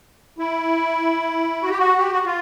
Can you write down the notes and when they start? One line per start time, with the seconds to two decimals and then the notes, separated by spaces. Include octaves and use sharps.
0.38 E4
1.63 F#4
1.70 G4
1.78 F#4
1.98 G4
2.12 F#4
2.25 F4